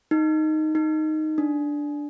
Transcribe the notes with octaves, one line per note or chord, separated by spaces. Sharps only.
D#4
D#4
D4